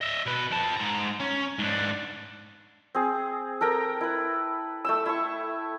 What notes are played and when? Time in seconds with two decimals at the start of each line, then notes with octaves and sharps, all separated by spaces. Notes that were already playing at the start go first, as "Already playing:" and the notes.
0.01 D#5 E5
0.26 B2 B4
0.51 F2 A5
0.76 G#2 A#5
1.20 C#4
1.58 G#2 D4
2.94 C4 G#4
3.61 A4 A#4 G5 A#5
4.01 E4 B4
4.85 A3 G5 E6
5.06 E4 C#6